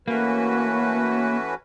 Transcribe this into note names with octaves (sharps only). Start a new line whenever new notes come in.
E3 A3 A#3 C#4 F#4 B4